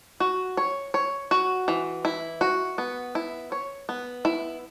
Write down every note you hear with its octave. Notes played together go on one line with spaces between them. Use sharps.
F#4
C#5
C#5
F#4
E3
E4
F#4
B3
E4
C#5
B3
E4